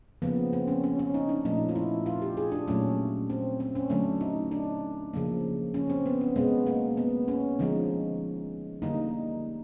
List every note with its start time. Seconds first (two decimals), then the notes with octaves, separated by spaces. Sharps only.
0.22 C#3 F3 A#3 B3
0.53 C4
0.67 C#4
0.84 C#4
0.99 C#4
1.14 D#4
1.29 D4
1.45 A#2 F3 A3 D#4
1.69 F4
1.76 E4
2.06 F4
2.22 G4
2.37 G#4
2.52 D4
2.68 A#2 F#3 A3 C#4
3.30 C4
3.60 C4
3.75 C#4
3.90 D3 F#3 A3 D4
4.21 D#4
4.51 D4
5.13 C#3 F3 A#3
5.74 C#4
5.90 C4
6.06 B3
6.21 C4
6.36 B2 G#3 B3
6.67 A#3
6.97 B3
7.28 C#4
7.59 D3 F3 G#3 D#4
8.82 D3 G3 A#3 D#4